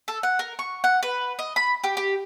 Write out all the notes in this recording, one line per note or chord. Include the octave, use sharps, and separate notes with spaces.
A4
F#5
A#4
C#6
F#5
B4
D#5
B5
G4
G4